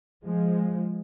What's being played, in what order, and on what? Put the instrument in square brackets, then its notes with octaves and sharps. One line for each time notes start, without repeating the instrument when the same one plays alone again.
[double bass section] F3 G#3